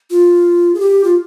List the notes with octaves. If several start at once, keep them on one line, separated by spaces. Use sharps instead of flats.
F4
G#4
G4
F4